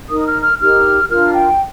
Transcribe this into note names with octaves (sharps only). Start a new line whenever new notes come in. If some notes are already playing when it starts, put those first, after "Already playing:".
D#4 A#4 D#6
F6
F6
D#4 G4 A#4 F6
D4 F4 A#4 F6
G5